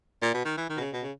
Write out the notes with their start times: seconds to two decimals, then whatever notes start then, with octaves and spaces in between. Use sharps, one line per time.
0.22 A#2
0.34 B2
0.45 D#3
0.57 E3
0.69 D#3
0.77 B2
0.80 C#3
0.93 B2
1.02 C#3